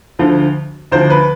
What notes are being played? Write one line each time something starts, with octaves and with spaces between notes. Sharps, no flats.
D2 D3 F3
D2 D3 F3 C5
B4